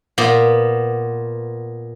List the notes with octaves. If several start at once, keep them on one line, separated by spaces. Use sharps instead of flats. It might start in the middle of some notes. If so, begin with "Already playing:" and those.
A#2 B3